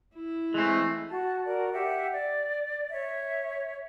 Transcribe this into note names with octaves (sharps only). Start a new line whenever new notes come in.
E4
E3 G#3 A3 C4
F#4 A5
F#4 A#4 D5
G4 E5 F#5
D5
C#5 E5